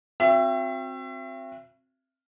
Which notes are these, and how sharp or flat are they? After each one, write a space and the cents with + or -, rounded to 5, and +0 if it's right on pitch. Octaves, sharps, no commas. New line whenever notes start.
C4 +5 F#4 -30 E5 +35